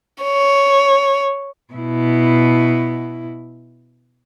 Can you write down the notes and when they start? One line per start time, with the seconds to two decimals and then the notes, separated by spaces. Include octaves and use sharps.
0.23 C#5
1.73 B2 E4